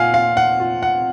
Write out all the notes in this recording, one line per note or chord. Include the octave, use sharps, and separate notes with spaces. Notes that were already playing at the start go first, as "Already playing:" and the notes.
Already playing: A#2 F5 F#5 G#5
F4 F5
F#5
F4
F#5